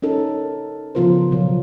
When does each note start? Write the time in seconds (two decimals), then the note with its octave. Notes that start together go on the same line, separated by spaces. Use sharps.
0.02 C#4 D#4 A4 A#4
0.95 C#3 F3 B3 F4 A#4 C5
1.31 B2 F3 F#3